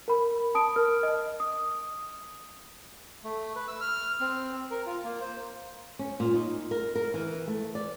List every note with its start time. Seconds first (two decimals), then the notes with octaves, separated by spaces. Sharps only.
0.08 A#4 B5
0.55 A5 D#6 D7
0.76 A#4 F6
1.03 D#5
1.40 D#6
3.24 A3
3.56 B4
3.68 E6
3.81 F6
4.20 C4
4.71 A#4
4.86 F4
5.04 A#3
5.21 C5
5.99 C#4
6.20 A#2
6.34 D#4
6.71 A#4
6.96 A#4
7.14 E3
7.48 A3
7.75 D5